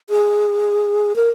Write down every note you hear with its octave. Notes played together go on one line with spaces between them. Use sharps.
G#4
A#4